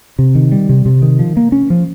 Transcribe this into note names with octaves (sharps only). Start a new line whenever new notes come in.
C3
D#3
G3
C3
C3
D#3
F3
A#3
C#4
F3